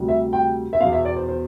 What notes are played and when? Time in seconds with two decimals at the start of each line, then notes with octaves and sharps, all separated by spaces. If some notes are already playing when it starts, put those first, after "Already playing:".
Already playing: D2 C3 G3
0.08 E5
0.33 G5
0.73 E5
0.80 B3 F5
0.83 E2 B2
0.93 E5
1.05 D5
1.16 C5
1.29 C5